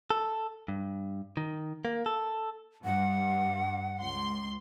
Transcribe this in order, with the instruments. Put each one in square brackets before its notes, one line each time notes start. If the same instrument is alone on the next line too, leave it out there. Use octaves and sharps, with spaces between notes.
[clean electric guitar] A4
G2
D#3
A#3
A4
[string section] G2 [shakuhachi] F#5
[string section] C#2 C6